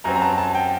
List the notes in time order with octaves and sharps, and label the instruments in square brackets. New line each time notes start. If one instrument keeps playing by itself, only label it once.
[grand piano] F#2 F#3 C4 A#5
A#5
A5
A5
G5